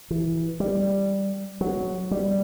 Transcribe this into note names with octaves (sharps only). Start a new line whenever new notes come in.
E3
G3
F#3
G3